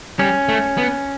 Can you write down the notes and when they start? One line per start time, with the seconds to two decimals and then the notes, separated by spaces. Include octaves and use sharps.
0.19 G3 C#4
0.49 A3
0.77 B3